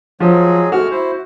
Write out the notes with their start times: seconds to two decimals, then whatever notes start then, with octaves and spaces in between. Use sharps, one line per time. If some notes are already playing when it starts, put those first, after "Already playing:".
0.20 F3 F#3 G#3 G#4
0.72 G#3 A3 F#4 F6
0.91 E4 C5